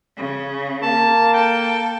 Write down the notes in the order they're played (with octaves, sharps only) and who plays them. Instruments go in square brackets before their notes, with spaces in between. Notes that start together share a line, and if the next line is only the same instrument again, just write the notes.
[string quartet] C#3
[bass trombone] A#3 [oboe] A5
[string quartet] A4 [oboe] G5